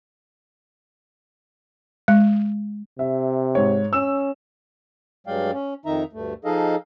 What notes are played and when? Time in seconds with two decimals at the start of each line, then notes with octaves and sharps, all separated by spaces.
2.08 G#3
2.99 C3 E5
3.55 G#2 C#5
3.93 C#4 E6 E7
5.27 G2 F#3 G#3 D5 F5 G5
5.53 C#4
5.86 F2 D#3 D#4 E5 A#5
6.13 D2 G2 A3
6.45 F3 D#4 G#4 A4 D#5 F5